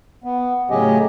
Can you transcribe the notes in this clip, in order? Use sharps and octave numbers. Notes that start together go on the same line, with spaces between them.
B3
A2 C#3 F#3 C#4 G4 D#5